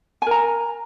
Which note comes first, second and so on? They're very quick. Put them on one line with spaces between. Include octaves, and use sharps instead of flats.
G#5 A#4 A#5